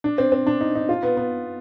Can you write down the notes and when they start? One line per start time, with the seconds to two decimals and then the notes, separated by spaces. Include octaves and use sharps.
0.04 D4
0.18 C4
0.32 C4
0.47 D4
0.61 D#4
0.75 D#4
0.89 F4
1.03 B3
1.17 B3